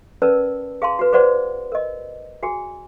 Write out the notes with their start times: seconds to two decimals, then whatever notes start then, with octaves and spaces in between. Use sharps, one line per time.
0.22 C#4 A#4 B4 D5 A5 E6
0.82 G#4 F5 A5 C6
0.99 F#4 B4
1.12 G#4 B4 C5 D5 F#5 C6
1.72 A#4 D#5
2.43 F#4 G#4 G#5